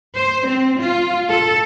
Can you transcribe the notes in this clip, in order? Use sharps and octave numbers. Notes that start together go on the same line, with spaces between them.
C5
C4
F4
A4